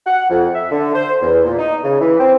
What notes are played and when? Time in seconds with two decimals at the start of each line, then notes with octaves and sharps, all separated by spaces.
0.07 F#5
0.30 F2
0.54 E5
0.72 D3
0.95 C5
1.22 E2
1.45 A#2
1.58 D#4
1.83 C#3
2.01 E3
2.20 C4